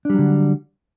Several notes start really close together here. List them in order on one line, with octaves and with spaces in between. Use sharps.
D4 G3 F#3 D3